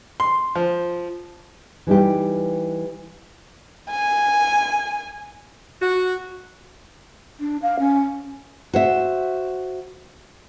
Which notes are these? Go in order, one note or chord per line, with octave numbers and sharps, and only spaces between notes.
C6
F3
E3 G3 D#4 G4
G#5
F#4
D4
F5
C#4
F#4 C5 E5